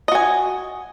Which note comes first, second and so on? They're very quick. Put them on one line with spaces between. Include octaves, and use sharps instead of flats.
D#5 F#4 G#5